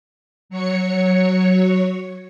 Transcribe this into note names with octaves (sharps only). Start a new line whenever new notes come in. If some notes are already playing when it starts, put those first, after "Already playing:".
F#3 C#5 C#7